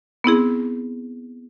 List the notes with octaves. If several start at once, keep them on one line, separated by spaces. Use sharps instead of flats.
B3 C4 E4 G#4